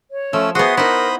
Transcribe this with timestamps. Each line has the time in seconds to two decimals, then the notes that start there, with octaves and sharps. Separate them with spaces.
0.10 C#5
0.33 F3 A3 C#4 E6
0.55 B3 F#4 G#4 C5 E5 C6 D#6
0.77 D#4 E4 A#4 C5 B5 D#6